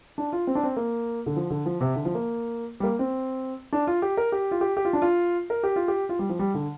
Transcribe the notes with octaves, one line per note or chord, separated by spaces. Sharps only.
D4
F4
C4
D4
C4
A#3
D3
F3
D3
F3
C3
D3
F3
A#3
G3
A#3
C4
D4
F4
G4
A#4
G4
F4
G4
G4
F4
D4
F4
A#4
G4
F4
G4
F4
G3
F3
G3
D3